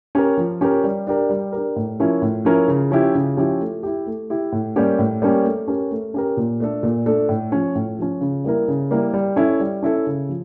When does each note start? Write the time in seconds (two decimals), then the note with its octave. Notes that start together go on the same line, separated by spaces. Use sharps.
0.15 C#4 G4 A#4
0.37 F3
0.61 C#4 G4 A#4
0.84 G3
1.07 D4 G4 A#4
1.30 G3
1.52 D4 G4 A#4
1.76 A2
1.99 F3 C#4 E4 A#4
2.22 A2
2.45 F3 C#4 E4 A#4
2.68 C#3
2.91 F3 C#4 E4 G4
3.15 C#3
3.37 F3 C#4 E4 G4
3.60 A3
3.83 E4 G4
4.06 A3
4.30 E4 G4
4.52 A2
4.76 G3 A#3 C#4 G4
4.99 A2
5.22 G3 A#3 C#4 G4
5.45 A3
5.68 C#4 G4 A#4
5.91 A3
6.14 C#4 G4 A#4
6.37 A#2
6.60 A3 D4 A4
6.83 A#2
7.06 A3 D4 A4
7.29 A2
7.52 F3 C#4
7.75 A2
7.99 F3 C#4
8.21 C#3
8.44 G3 A#3 E4 A#4
8.68 C#3
8.91 G3 A#3 E4 A#4
9.13 G3
9.36 C#4 E4 A4
9.60 G3
9.82 C#4 E4 A4
10.06 C#3
10.29 F3